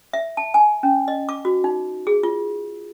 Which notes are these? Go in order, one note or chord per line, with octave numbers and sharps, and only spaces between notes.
E5
A5
G#5
C#4
D#5
D6
F#4
D#4
G#4
F4